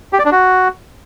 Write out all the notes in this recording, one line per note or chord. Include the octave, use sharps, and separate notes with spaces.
G4
D5
D4
F#4